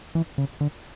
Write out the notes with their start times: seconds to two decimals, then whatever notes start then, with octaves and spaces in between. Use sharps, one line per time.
0.15 E3
0.38 C#3
0.61 D3